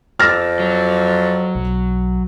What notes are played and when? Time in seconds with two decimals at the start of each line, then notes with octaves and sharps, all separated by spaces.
0.19 F2 D6 E6 F6 A6 A#6
0.60 F#3
1.55 B1